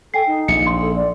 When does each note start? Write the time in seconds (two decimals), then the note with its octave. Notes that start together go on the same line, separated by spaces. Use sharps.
0.14 A4 G5 G#5 C7
0.27 D#4
0.48 A#1 C#7
0.67 C6
0.81 A4
0.96 D5